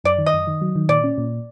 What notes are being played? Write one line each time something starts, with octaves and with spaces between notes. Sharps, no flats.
F#2 D5
D#3
D#5
F#2
D#3
F#3
D#3
A#2 D5
C#4
A#2